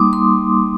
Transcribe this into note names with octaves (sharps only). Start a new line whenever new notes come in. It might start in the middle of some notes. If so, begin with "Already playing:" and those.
Already playing: G3 A#3 D#4 C6 D6 D#6
C6